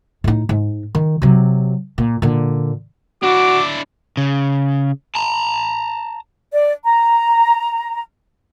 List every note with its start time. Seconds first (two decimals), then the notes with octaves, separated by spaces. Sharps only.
0.24 A2 D#4
0.49 G#2
0.95 D#3
1.22 C3 F#3
1.98 A#2
2.22 A#2 D3
3.23 D4 E4 F#4 D6
4.17 C#3
5.15 A5 A#5
6.52 D5
6.84 A#5